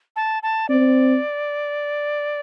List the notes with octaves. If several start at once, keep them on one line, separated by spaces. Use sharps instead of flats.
A5
A5
C4 D5